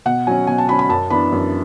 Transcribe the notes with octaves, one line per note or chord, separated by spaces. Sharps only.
B2 F#5
F#3 C#4 G#5
B2 G#5
A5
F#3 C#4 B5
B5
F#2 A5
E3 B3 D4 B5
F#2